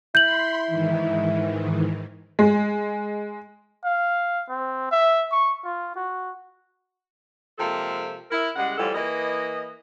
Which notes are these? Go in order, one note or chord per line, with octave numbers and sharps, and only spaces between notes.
E4 B5 C6 G6 F#7
G#2 D#3 E3
G#3
F5
C4
E5
C#6
F4
F#4
C3 F3 G#3 A#3 A4
E4 A#4
C#3 G3 G#3 F#5
A2 E3 F3 G3 F4 A4
E3 A#3 B4 D#5